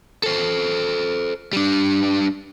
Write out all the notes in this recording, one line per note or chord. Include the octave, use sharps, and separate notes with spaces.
A4 C5
G3 D4